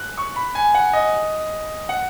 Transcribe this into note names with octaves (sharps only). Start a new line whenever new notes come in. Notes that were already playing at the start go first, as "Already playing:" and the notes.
Already playing: F#6
C#6
B5
G#5
F#5
D#5
F#5